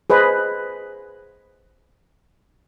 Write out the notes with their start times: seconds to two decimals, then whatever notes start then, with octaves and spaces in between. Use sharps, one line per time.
0.10 G#4 B4 C5 D#5